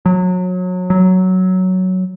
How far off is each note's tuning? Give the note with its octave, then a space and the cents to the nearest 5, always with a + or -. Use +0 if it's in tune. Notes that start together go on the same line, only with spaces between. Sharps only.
F#3 -25
F#3 +5